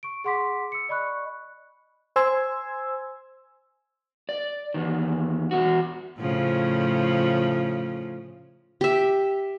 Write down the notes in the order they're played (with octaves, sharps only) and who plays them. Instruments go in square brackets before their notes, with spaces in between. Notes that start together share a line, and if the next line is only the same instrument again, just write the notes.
[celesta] C#6 D7
G#4 F#5 C6 D6 B6
E6 C#7
D5 D#5 B5 C#6 F#6
[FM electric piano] C5 G#5 C6 E6 G#6
[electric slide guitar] D5
E2 D#3
E2 G2 F#4
[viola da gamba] A2 C#3 F3
[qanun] G4 E5